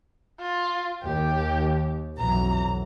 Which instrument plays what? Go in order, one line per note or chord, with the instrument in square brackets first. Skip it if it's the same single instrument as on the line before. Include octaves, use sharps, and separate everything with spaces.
[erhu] F4
[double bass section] D#2 [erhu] G4
[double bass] B1 [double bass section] F2 E3 F#3 [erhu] A#5